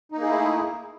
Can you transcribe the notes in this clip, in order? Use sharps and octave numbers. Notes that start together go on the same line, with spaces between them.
A3 A#3 D#4 E4 G#4